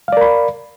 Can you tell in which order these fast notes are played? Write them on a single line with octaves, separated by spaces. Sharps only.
F5 D5 A#4 B5